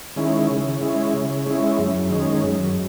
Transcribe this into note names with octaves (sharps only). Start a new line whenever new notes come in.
D#3 G#3 C#4 E4
C#3
G#3 C#4 E4
C#3
G#3 C#4 E4
F#2
D#3 G#3 C#4
F#2